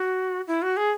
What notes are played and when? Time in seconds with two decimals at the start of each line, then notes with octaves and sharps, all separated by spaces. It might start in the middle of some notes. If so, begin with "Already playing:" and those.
Already playing: F#4
0.47 E4
0.62 F#4
0.77 G#4